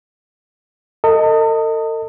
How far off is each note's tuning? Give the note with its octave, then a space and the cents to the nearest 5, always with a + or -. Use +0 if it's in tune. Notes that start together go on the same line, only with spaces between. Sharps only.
A4 +45 D#5 +0